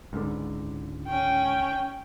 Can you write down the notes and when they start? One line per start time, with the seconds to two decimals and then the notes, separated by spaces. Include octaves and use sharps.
0.13 C#2 G#2 D3
1.07 C#4 G5